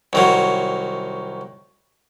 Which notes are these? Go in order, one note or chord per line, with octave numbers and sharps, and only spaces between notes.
C2 D#3 F#3